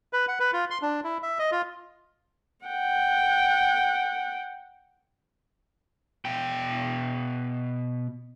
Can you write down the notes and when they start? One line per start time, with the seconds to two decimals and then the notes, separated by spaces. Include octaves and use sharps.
0.13 B4
0.28 F#5
0.40 B4
0.53 F4
0.71 C6
0.82 D4
1.04 E4
1.23 E5
1.39 D#5
1.52 F4
2.66 F#5 G5
6.25 B2 G5